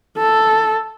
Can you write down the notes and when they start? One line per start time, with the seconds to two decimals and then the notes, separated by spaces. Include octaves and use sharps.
0.18 A4